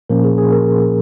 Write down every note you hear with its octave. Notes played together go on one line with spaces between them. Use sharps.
A#2 F3 A#3 C#4 A#4
G#4
G#4
A#4